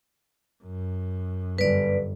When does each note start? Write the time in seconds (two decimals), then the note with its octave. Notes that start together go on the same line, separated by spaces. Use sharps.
0.64 F#2
1.58 G1 B4 D5